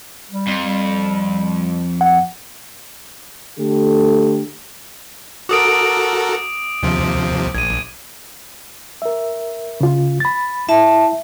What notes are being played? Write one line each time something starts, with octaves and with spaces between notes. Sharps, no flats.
G3
F2
G3
F#5
D3 A3 G4 A4
F#4 A4 A#4 D6 D#6 D7
D#2 C3 F3
A#1 G#6 D#7
A#4 E5
C#3 F4
B5 A6
E4 E5 A5